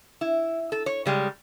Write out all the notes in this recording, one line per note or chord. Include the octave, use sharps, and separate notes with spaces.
E4
A4
C#5
C#3 G3 G#3 C#4